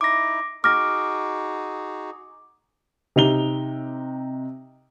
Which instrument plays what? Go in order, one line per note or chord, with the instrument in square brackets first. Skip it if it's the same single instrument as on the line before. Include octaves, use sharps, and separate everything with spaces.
[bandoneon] D#4 E4 [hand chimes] D6 A#6
[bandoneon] D#4 F#4 G#4 [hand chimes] D6 [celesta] F6 A#6
[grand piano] C3 D#4 F7 G7